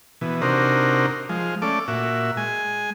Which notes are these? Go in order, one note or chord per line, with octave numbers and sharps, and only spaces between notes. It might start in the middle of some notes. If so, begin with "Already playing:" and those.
B2 E3
C3 D4 D#4 F#4 A#4 C5
F3 G#3
A3 C#4 A4 D5 D6
A#2 F#4 E5
G#3 G#5